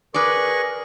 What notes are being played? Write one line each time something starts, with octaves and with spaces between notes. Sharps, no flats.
G#4 A#4 B4 D5 C#6